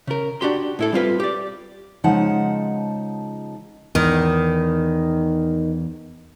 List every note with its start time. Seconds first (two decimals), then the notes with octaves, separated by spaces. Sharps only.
0.07 C#3 A#4
0.41 D4 F#4 G4 C6
0.79 A2 E4 A4
0.93 G3 C4 F4 B4
1.20 G4 D5
2.04 C#3 F3 G#3 D#4 F#5 A5
3.95 E2 D#3